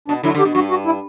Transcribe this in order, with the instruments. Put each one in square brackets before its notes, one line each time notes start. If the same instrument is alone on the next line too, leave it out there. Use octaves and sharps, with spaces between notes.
[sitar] B2 [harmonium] D4
[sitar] D3 F#3 [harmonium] E4
[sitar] D3
[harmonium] G4
[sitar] B2
[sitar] G2 [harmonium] F#4
[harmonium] F#4
E4